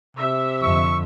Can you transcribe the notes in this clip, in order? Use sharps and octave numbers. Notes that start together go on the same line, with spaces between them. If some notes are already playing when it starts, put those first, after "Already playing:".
C3 E5
F2 D3 C#6